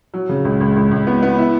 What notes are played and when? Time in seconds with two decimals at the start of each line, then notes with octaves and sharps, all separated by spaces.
0.14 F#3
0.29 C#3
0.45 C#2
0.61 C#2
0.76 C#2
0.91 C#2
1.07 B3
1.23 B3
1.38 E4